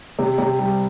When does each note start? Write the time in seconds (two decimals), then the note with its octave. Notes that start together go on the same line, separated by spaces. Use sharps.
0.19 C3
0.38 C3
0.58 G3